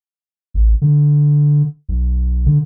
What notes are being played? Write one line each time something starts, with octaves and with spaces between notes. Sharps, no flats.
A1
D3
B1
D3